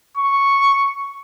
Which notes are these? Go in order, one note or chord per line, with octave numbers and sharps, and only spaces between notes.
C#6